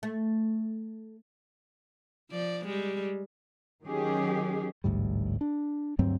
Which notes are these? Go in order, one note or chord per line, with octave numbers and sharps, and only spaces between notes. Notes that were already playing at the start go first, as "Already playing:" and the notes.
A3
F3 D5
G3 G#3
D#3 F#3 C#4 G4 G#4
A1 D2 G#2 G3
D4
D2 G2 F#3 C4